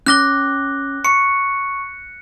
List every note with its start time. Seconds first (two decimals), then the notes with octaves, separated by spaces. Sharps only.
0.06 C#4 D6 F6 F#6 A#6 G7
1.05 C#6 C#7